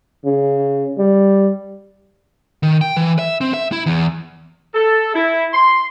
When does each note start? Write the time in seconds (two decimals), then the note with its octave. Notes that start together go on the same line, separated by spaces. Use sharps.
0.25 C#3
0.98 G3
2.63 D#3
2.81 G5
2.97 E3
3.19 E5
3.41 C4
3.54 E5
3.72 E4
3.86 E2
4.74 A4
5.15 E4
5.53 C6